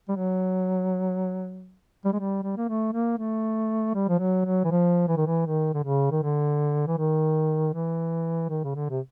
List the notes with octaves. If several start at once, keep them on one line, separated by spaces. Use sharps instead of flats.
G3
F#3
G3
G#3
G3
G3
A#3
A3
A#3
A3
G3
F3
F#3
F#3
E3
F3
E3
D#3
E3
D#3
D3
C#3
D#3
D3
E3
D#3
E3
D#3
C#3
D3
C3